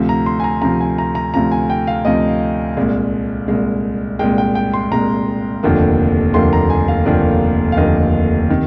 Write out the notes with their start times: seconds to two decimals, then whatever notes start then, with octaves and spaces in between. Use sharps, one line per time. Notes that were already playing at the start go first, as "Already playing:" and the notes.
Already playing: D2 C3 F3
0.09 A#5
0.26 C6
0.40 G#5
0.44 A#5
0.62 D2 C3 F3 A#5
0.81 G#5
0.98 A#5
1.15 A#5
1.34 D2 C3 F3 A#5
1.51 G#5
1.70 G5
1.87 F5
2.05 D2 C3 F3 D#5
2.77 C2 A#2 G#3
3.48 C2 A#2 G#3
4.19 C2 A#2 G#3 G5
4.38 G5
4.55 G5
4.73 C6
4.91 C2 A#2 G#3 A#5
5.63 F1 D#2 D3 F3 A#3
6.34 F1 D#2 D3 F3 A#3 C6
6.53 A#5
6.70 G#5
6.88 F5
7.05 F1 D#2 D3 F3 A#3 D5
7.72 F5
7.77 F1 D#2 D3 F3 A#3 D#5
8.50 C3 D#3